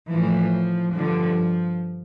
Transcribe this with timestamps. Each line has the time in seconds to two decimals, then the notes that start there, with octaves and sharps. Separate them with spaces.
0.10 A2 E3 F3
0.94 G2 D3 F3